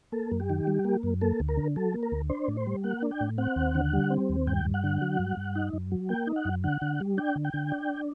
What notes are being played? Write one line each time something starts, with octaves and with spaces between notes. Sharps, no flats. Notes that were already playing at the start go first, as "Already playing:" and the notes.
A#3 A4
F#2
G4
D#3
G3
A#3
F#2
A#3 A4
D2
A#4
D3
F#3 A4
A#3
A#4
D2
D4 C5
A2
C5
G3
A#3 F#5
D4
G5
A2
C4 F#5
D#2
D3
G3
C4
D#2
G2 G5
G2
F#5
D3
F#3
G2
G2
D#4
F#2
F#3
A#3 G5
D#4
F#5
F#2
D3 F#5
D3
G3
D4 G5
D3
G5
D3
D4